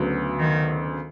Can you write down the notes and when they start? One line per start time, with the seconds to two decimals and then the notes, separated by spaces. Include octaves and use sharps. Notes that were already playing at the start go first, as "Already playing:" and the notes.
Already playing: D2 C#3 F#3 B3
0.39 D#3